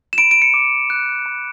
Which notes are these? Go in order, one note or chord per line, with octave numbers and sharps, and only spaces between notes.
E7
B5 D7
D7
C#7
D6
F#6
B5